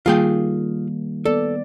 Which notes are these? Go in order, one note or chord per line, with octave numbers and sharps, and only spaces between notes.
D#3 G3 A#3 F4 G#4 G5
B3 A4 D5